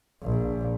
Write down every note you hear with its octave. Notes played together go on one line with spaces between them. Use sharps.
A#1